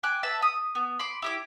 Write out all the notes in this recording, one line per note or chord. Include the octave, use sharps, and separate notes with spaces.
G5 G#5 D6 F#6
B4 E5 A5
D#6
B3
B5 C6 D6
E4 G4 D6